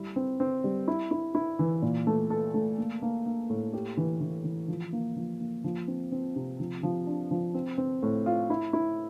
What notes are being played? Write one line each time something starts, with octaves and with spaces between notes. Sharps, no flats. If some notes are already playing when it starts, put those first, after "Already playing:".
Already playing: G3 E4
C4
C4
G3
E4
E4
E4
E3
A#2
A3
A4
A3
A#3
A#3
A#3
A2
G4
E3
E3
E3
F3
A#3
F3
A#3
F3
C4
C4
C3
F3
F3
D4
F3
C4
C4
A2
F4
E4
E4